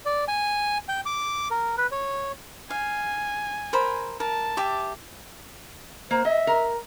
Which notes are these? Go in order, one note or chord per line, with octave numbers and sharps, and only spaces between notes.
D5
G#5
G5
D6
A#4
B4
C#5
F5 G#5
A#4 C5 B5
A#4 A5
G4 E5 D6
A#3 C5
D#5 E5
A#4